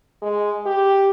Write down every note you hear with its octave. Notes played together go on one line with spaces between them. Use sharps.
G#3
G4